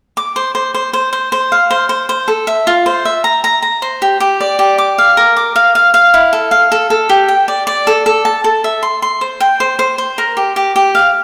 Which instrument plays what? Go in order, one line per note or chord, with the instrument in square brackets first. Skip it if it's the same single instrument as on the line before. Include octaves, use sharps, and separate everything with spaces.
[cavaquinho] D6
C5
C5
C5
C5
C5
C5
F5
C5
C5
C5
A4
E5
F4
C5
E5
A#5
A#5
A#5
C5
G4
G4
D5
G4
D6
F5
A#4
D6
F5
F5
F5
E4
A4
F5
A4
A4
G4
G5
D5
D5
A4
A4
A5
A4
E5
C6
C6
C5
G5
C5
C5
C5
A#4
G4
G4
G4
F5